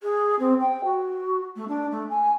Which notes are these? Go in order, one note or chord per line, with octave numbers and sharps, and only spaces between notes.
G#4
C4
G5
F#4
A3
D4
A3
G#5